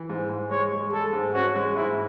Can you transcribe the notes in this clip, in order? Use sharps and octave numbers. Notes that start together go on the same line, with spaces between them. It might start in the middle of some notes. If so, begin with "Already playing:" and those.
Already playing: E3
G#2
G#2
G#3 C#5
G#3
G#3 A4
G#2
C#4 F#4
G#3
G#2 E4